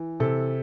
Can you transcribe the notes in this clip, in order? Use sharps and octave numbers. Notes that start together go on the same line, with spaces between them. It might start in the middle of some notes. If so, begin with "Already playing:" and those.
Already playing: E3
C3 A4